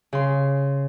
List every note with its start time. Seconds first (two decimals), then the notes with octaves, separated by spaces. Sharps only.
0.13 C#3 C6